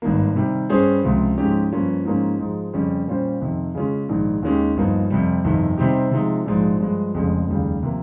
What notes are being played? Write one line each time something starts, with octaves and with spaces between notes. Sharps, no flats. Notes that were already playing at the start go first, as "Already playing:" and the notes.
G#1 G2 D#3 A#3
C3 D#3 G3
G2 G3 C#4 G#4 C5
C#2 C3 F3
G#2 F3 G#3 C#4 G4
G2 F3 A#3 C#4 F4
G#2 F3 A#3 C#4
G#2 F3 G#3 D#4
F2 C#3 G3 C#4
A#2 G3 C#4 F4 C5
F2 C3 D#3
C#3 G#3 C#4 F4
A#1 G#2 D#3
D#2 D#3 G#3 C#4 G4
G1 G2 F3 A#3 D#4
F2 C3 G3
G1 F2 C3 D#3
C3 G3 C4 D#4 G4
C3 F3 G#3 D#4
A#1 G#2 F3 G#3
G2 F3 G#3
F1 F2 C#3 G#3
F1 D#2 C#3 G3
C3 F3 A#3